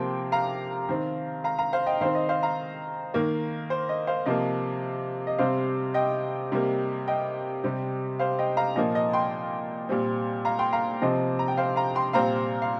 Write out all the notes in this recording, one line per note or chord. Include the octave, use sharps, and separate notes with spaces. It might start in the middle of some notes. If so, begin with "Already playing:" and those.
Already playing: C3 F3 A#3 G5 C6
F5 A#5
D#3 C4
F5 A#5
F5 A#5
C5 F5
D#5 G5
D#3 C4 C5 F5
D#5
C5 F5
F5 A#5
D#3 A#3
C5
D#5
C5 F5
C3 F3 A#3 D#5
D#5
C3 G3 C4 C5 F5
D#5 G5
C3 G3 A#3
D#5 G5
C3 G3 C4
C5 F5
D#5 G5
F5 A#5
A#2 F3 A#3 D#5
D#5
G5 C6
A#2 G3 C4
F5 A#5
G5 C6
F5 A#5
C3 F3 C4 D#5
A#5
G5
C5 F5
F5 A#5
G5 C6
A#2 G3 C4 F5 A#5
F5